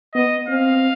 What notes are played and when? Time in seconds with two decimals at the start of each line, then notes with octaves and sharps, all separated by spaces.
0.15 B3 D#5
0.48 C4 F5